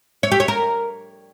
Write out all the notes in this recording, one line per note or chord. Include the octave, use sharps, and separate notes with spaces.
C#5
G4
C#5
A#4